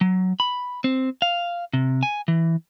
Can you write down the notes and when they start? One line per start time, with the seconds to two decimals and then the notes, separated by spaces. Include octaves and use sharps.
0.01 F#3
0.40 B5
0.84 C4
1.22 F5
1.73 C3
2.03 G#5
2.28 E3